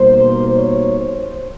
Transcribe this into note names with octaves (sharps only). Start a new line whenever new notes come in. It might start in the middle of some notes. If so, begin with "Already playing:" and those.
Already playing: B2 G3 A#3 D#4 C5
C#5
C5